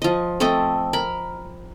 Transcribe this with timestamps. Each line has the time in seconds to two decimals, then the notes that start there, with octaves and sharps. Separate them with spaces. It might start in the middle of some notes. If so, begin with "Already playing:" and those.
0.02 F3 D#5
0.40 A3 C4 A4 D#5
0.93 A#4 B5